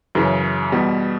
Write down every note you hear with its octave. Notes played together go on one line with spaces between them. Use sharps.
F#2 C#3 E3
E2 B2 G3